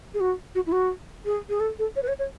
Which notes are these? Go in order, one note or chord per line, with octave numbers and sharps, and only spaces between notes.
G#4
F#4
F#4
E4
F#4
G#4
G#4
A4
A4
C#5
B4
C#5
C#5